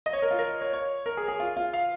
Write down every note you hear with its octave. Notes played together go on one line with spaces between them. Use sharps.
D#5
C#5
A#4
F4
A#4
C#5
C#5
A#4
G#4
G#4
F4
F4
F5